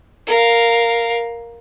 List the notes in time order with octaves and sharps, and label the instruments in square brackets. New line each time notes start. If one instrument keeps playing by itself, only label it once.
[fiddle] A#4 F5